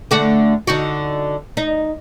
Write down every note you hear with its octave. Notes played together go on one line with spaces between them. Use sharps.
D3 A3 F#4
D3 D#4 F#4
D#4